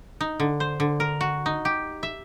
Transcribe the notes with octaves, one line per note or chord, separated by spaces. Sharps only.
D#4
D3
C5
D3
A#4
F#4
D#4
G4
E5